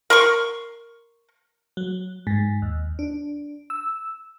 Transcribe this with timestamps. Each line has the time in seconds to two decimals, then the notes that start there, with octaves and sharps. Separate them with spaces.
0.10 A#4 C6 C#6
1.77 F#3
2.27 G#2
2.62 D#2
2.99 D4
3.70 E6